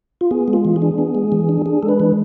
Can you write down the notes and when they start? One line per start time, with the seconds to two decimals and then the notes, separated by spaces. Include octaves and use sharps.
0.21 F4
0.31 B3 G#4
0.48 G#3
0.53 F4
0.65 E3
0.76 G#4
0.82 D4
0.98 B3
1.15 G#3
1.32 E3
1.49 D4
1.66 D4 G#4
1.83 G#3 A4
1.89 B4
2.00 E3